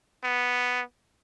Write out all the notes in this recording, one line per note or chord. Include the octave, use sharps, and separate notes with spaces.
B3